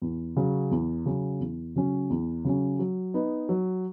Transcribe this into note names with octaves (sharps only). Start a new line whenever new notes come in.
E2
C#3 F#3 C#4
E2
C#3 F#3 C#4
E2
C#3 F#3 C#4
E2
C#3 F#3 C#4
F#3
B3 D#4
F#3